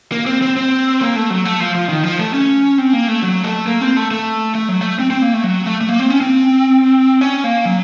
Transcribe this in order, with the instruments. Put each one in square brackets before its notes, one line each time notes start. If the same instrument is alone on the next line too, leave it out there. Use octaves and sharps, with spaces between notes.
[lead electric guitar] A#3
C4
C4
C4
A#3
A3
F#3
A3
F3
F3
D#3
F3
A3
C#4
C4
A#3
A3
F#3
A3
A#3
C4
A3
A3
A3
F#3
A3
C4
C4
A#3
A3
F#3
A3
A3
A#3
C4
C#4
C4
C#4
A#3
F#3